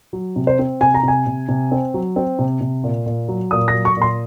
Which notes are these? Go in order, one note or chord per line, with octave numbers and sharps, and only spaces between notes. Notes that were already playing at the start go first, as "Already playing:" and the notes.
F#3
C3
C5
C4
C3 G#5
A#5
C3 G#5
C3
C3
C4
F#3
C4
C3
C3
A#2
A#2
F#3
A#2 D#6
A#6
F#3
C#6
A#2 C6